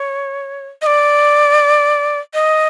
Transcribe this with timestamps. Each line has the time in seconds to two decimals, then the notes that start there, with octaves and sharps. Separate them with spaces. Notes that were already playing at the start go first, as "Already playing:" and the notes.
Already playing: C#5
0.82 D#5
0.87 D5
2.34 D#5